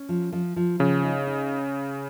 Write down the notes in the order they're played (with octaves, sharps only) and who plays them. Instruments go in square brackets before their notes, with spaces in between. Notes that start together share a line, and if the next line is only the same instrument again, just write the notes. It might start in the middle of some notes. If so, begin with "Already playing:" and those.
Already playing: [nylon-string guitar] C#4
F3
F3
F3
[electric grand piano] C#3 [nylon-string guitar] F3
[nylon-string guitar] D#4
D#4